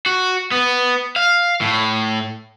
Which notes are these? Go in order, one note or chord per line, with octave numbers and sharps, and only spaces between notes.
F#4
B3
F5
A2